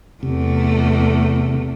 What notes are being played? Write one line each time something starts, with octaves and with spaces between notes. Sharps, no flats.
E2 C3 A3